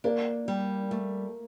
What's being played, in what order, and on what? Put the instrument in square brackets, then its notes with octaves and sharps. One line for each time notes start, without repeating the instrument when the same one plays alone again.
[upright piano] A#3 [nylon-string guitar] D4
[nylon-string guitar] G3
A3